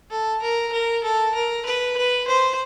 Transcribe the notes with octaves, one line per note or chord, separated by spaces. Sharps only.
A4
A#4
A#4
A4
A#4
B4
B4
C5